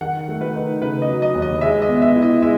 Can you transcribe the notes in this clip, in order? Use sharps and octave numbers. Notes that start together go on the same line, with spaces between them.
D#3 F#5
A3
B4
D#4
C#3 B4
D#5
F#3
D#5
D#2
D#5
G#3 E5
D#5
B3
E5
E4
D#5
G#3 E5